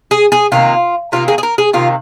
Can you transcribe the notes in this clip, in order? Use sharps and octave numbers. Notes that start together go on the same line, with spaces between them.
G#4
G#4
C3 D#3 A#3 F4
C3 D#3 A#3 F4
G#4
G#4
A#4
G#4
C3 D#3 A#3 F4